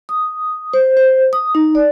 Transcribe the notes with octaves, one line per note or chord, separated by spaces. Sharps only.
D#6
C5
C5
D#6
D#4
D5